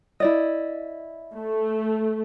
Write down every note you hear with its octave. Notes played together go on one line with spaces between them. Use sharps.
E4 D5 D#5
A3